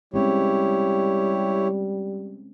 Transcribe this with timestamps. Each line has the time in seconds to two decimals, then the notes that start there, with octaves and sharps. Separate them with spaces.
0.14 G3 G#3 C4 C#4 E4 G4 C#5